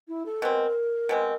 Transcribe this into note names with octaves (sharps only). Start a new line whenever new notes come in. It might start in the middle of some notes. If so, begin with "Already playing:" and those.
E4
A4
B2 G#3 C4 A#4
B2 G#3 C4